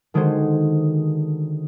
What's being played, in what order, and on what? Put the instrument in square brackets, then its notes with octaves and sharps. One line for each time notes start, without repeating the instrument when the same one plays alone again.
[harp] D3 D#3 G#3 F#4 G#4 C5